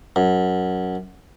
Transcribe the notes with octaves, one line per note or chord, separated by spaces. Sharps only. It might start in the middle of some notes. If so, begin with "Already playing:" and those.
F#2